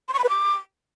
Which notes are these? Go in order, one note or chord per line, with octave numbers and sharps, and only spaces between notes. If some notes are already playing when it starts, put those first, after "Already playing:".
C6
C#6
B5
B4
D6